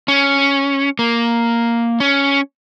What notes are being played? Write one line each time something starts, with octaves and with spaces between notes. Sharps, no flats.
C#4
A#3
C#4